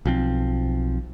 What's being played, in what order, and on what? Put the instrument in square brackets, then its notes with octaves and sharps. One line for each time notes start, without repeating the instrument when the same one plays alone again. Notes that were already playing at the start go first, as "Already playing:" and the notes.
[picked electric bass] B1 F3 C4